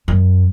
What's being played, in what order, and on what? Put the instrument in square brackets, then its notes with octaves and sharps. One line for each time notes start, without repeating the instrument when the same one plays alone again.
[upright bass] F#2